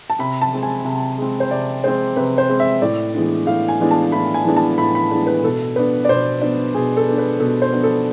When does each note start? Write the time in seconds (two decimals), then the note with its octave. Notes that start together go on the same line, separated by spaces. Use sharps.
0.10 A5
0.19 C3 B5
0.42 A5
0.53 G#3 C4
0.63 G#5
0.85 C3
1.18 G#3 C4
1.40 C5
1.50 C3 D5
1.83 G#3 C4 C5
2.16 C3 B4
2.38 C5
2.49 G#3 C4
2.60 E5
2.82 A2 D5
3.14 E3 G#3 B3 D4
3.47 A2 F5
3.68 G#5
3.80 E3 G#3 B3 D4
3.91 A5
4.12 A2 B5
4.34 G#5
4.45 E3 G#3 B3 D4
4.57 A5
4.78 A2 B5
4.95 B5
5.11 E3 G#3 B3 D4
5.27 B4
5.43 B2 A4
5.76 B3 D4 B4
6.05 D5
6.09 B2 C5
6.41 B3 D4 D5
6.74 B2 G#4
6.97 A4
7.08 B3 D4
7.18 B4
7.40 B2 A4
7.62 C5
7.73 B3 D4
7.83 A4